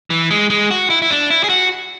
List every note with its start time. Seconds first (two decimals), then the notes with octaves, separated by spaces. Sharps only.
0.10 E3
0.31 G#3
0.50 G#3
0.71 F#4
0.90 E4
1.02 E4
1.10 D4
1.30 E4
1.44 G#4
1.50 F#4